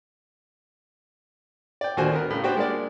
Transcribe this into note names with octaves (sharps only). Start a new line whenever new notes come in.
D5 G5
D#2 A#2 D3 F#4 C5 G#5
B3 A#4
A2 C#3
B3 D4 F#4 G4 C5 G5
G#3 A#3 D4 D5